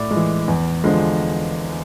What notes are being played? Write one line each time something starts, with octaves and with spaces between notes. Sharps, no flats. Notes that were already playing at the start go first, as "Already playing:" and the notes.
Already playing: A2 D5
G#3
E3
E2
D3 F3 G#3